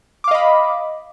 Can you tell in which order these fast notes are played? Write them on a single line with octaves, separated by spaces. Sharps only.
D6 F5 D#5 B5